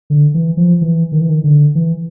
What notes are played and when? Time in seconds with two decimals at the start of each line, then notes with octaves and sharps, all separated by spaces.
0.10 D3
0.34 E3
0.57 F3
0.81 E3
1.12 D#3
1.21 E3
1.29 D#3
1.44 D3
1.75 E3